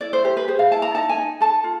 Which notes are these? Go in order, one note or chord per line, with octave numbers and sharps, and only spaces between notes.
E4 D5
C5
G4 C5
B4
G#4 C5
F5
E4 A5
A#5
D#4 A5
G#5
D#4
A4 A5
F4